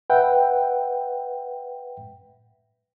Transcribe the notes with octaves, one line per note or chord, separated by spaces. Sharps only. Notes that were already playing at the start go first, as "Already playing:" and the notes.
B4 E5 F#5 G5